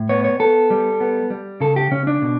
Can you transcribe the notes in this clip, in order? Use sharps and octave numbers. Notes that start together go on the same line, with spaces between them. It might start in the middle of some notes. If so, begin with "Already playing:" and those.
Already playing: A2
B3 C#5
C#5
B3 A4
G3
B3
G3
C#3 A4
G4
C#3 C#4
D4
B2